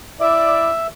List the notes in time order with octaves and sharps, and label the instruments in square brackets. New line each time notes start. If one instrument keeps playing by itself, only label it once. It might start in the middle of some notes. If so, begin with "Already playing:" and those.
[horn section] E4 D5 [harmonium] E5